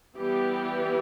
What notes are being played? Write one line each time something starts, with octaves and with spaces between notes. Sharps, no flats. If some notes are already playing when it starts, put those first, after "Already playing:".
E3 G3 B3 G4